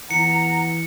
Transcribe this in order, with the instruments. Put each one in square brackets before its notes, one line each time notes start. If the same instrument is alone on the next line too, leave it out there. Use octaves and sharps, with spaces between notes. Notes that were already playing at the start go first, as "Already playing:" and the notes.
[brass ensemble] E2 F#5 A#5 [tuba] E3 [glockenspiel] C#7